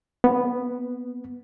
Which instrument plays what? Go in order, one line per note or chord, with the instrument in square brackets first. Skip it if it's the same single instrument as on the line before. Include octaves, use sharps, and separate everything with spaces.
[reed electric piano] B3